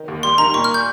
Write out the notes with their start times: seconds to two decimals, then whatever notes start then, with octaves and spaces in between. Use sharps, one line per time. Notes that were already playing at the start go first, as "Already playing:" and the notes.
Already playing: D#3
0.08 D#2
0.23 G3 C6
0.38 D#3 A#5
0.54 A#2 C#6
0.64 F6
0.74 G6